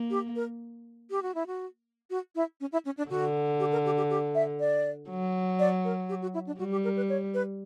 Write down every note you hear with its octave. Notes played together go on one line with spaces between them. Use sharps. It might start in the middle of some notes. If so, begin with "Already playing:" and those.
Already playing: A#3
G4
A#4
G4
F#4
E4
F#4
F#4
E4
C#4
E4
C#4
D4
D3 F#4
G4
A#4
G4
G4
G4
E5
D5
F#3
D5
A#4
G4
F#4
E4
D4
G3 F#4
G4
A#4
B4
C#5
B4